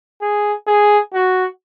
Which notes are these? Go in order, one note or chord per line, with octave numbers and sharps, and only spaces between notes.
G#4
G#4
F#4